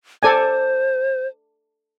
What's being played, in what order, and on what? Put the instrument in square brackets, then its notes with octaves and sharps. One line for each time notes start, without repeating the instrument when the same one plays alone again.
[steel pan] A4 D5 G#5 [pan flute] C5